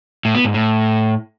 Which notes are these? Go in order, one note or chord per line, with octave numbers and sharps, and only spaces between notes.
A2
B3
G#2
A2